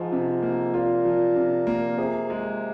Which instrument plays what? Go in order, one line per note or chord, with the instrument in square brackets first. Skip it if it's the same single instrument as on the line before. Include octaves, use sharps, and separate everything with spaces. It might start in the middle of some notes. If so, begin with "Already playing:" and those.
Already playing: [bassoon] G#2 [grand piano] F3 F4
[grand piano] C3
A#3
[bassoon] A#2 [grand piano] F4
[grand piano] F3
C3
A#3
[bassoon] C3 [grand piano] G#4
[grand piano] G#3